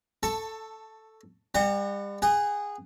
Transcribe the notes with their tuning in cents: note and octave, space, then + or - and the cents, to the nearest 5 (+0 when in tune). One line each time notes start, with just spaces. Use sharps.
A4 +0 A5 +20 C#6 +0
G3 +35 F#5 +0 A#5 -35
G#4 -15 F#5 +25